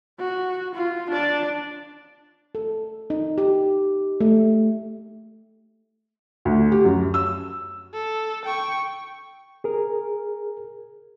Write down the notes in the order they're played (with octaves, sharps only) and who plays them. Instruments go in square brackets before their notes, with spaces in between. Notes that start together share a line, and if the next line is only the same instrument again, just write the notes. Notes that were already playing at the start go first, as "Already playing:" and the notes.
[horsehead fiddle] F#4
F4
D4 D5
[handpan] A4
D#4
G4
A3
[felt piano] D2
G4
F#2
E6
[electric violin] A4
G5 C#6
[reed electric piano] G#4 A#4